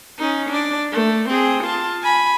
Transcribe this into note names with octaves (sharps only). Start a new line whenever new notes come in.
C#4 D#4
D4 D5
A3
C4 G#4
F4 A5
G#5 B5